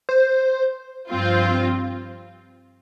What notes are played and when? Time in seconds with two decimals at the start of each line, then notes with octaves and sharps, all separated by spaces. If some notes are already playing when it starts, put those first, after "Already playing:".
0.09 C5
1.09 G2 F3 C4 F4